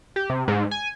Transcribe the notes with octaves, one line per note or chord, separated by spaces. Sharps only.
G4
C3
G#2
G#5